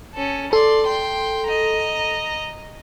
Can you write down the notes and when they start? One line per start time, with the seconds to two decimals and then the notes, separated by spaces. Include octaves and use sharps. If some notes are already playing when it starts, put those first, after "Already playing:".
0.15 C#4 A4
0.53 A4 D5 C6
0.86 G5 C6
1.47 D#5 A#5